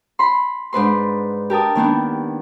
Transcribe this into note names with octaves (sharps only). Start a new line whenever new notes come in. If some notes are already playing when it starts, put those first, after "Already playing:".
B5 C6
G#2 D4 B4 C6
G4 A#4 A5 D#6
D#3 A#3 B3 D4